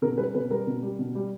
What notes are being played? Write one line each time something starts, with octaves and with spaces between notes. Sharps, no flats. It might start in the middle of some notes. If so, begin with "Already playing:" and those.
B2 A#4
G3 B4
B2 B4
G3 A#4
B2
G3
B2
G3